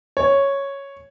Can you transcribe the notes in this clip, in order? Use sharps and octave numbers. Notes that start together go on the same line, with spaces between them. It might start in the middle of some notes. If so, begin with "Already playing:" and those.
C#5